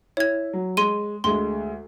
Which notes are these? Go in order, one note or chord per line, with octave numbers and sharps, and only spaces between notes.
E4 C#5 G#6
F#3
G#3 C6 D#7
D2 G#3 C6